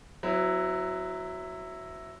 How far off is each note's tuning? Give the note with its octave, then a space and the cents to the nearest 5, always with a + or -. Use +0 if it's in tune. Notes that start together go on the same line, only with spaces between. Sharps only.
F#3 +0 C4 -40 E4 +0